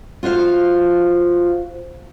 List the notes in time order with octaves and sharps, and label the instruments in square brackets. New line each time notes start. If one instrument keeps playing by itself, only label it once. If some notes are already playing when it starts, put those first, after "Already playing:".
[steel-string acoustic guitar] F4 F#4 C5 F5